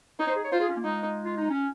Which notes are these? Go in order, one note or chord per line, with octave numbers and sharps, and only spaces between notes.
D#4 C#5
C5
G#4
C#5
F4 C5
G#4
C#4
A#3
G#3 D#4
F4
D#4
C#4